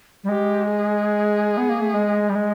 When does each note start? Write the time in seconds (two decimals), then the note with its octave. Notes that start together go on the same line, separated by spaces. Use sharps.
0.24 G3
0.29 G#3 G4
0.70 G#4
1.58 B3
1.70 A#3
1.81 A3
1.94 G#3
2.29 G3
2.35 G#3